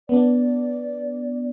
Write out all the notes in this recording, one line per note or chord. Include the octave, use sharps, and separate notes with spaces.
B3 D4 D5